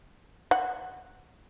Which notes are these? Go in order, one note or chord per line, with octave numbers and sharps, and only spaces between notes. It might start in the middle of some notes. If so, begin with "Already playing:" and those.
F#5